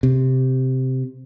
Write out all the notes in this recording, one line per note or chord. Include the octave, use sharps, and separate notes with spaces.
C3